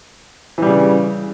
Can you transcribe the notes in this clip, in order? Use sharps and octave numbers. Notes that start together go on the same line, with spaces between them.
C#3 E3 G3